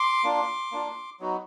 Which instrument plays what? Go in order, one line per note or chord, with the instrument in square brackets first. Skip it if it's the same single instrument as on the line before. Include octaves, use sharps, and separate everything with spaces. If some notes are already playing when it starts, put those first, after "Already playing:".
Already playing: [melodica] C6 D6
A#3 D4 F4
A#3 D4 F4
F#3 B3 D#4 F#4